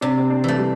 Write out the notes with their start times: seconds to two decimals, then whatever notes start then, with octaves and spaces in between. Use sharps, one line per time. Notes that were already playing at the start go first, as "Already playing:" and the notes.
0.01 C3 D4
0.18 C4
0.30 D4
0.44 E3 A3
0.58 G3